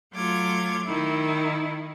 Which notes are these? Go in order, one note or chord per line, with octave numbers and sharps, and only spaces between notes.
F#3 A3 F4 D6 G#6
D#3 E4